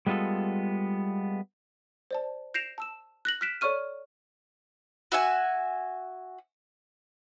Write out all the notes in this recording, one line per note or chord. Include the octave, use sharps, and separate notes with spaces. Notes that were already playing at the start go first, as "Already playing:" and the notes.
G3 G#3 B3 F4 A4
C5 D5 A5
G6 A#6 C7 D7 E7 F7
A5 E6 E7
F#6 A#6 F#7
F6 F#6 B6 D7 E7
A4 C#5 D5 C#6 F6 D#7
F#4 E5 G#5